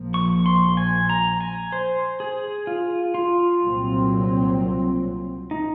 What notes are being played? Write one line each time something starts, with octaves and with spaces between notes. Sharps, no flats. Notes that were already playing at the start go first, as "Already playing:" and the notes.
Already playing: A#1 A#2 F3
C#6
C6
G#5
A#5
G#5
C5
G#4
F4
F4
C2 A#2 F#3 C4
D#4